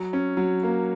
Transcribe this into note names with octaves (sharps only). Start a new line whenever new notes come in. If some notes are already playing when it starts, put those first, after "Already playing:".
Already playing: F#3
C#4
F#3
A#3